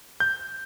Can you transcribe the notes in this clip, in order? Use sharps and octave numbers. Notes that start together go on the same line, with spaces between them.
G6